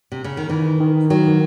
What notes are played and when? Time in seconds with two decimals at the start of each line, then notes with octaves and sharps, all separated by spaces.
0.12 C3
0.24 C#3
0.37 D#3
0.49 D#3 E3
0.80 D#3
1.10 D#3 F#3